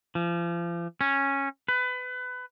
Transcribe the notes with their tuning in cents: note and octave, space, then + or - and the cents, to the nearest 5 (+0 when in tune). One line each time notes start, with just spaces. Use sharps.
F3 -35
C#4 -10
B4 +25